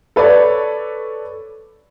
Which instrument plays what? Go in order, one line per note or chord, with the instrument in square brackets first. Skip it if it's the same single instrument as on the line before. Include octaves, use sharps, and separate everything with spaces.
[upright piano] A4 B4 C#5 D5